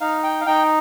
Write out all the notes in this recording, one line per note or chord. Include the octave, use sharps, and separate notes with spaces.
D#4 F5
G5
F5
D#4 G5